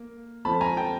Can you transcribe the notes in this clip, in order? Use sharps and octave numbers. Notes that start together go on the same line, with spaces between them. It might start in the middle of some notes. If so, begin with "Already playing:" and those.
Already playing: A#3
F3 A3 C4 A5 B5
G#5 A#5
G5 A5